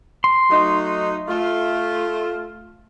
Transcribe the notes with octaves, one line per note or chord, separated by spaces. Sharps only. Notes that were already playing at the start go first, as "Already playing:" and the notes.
C6
F#3 A3 D#4
A3 F4